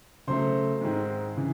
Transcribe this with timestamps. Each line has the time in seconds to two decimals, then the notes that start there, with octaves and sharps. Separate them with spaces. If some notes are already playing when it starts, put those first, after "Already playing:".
0.27 C#3 F#3 A3 C5 C6
0.81 G#2 D#3 G#3 C4
1.36 C#3 E3